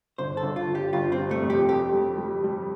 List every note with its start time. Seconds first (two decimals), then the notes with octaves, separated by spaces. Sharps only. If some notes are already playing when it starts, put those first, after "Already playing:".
0.18 G1 C5
0.37 A4
0.43 G1
0.56 F4
0.69 G1
0.75 G4
0.93 G1 F4
1.12 C4
1.18 C3
1.31 A3
1.43 F2
1.50 G4
1.69 G4 A4
1.93 G3
2.18 G3
2.44 G3